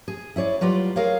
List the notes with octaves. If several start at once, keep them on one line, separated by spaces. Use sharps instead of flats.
G#4
E4 G#4 C#5 D5
F#3 G3 F4 B4 D5
G#4 A#4 C#5 F5